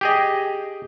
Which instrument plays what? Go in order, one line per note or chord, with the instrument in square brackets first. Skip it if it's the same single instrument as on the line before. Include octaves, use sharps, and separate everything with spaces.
[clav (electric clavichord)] G4 G#4 D#5